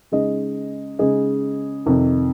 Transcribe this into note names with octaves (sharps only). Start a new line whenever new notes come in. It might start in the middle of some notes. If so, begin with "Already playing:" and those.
C#3 G#3 D#4 G#4 D#5
C#3 G#3 D#4 G#4 D#5
F2 C3 D#3